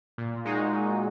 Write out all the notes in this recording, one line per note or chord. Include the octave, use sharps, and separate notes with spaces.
A#2
G#3 D#4 F#4
A#2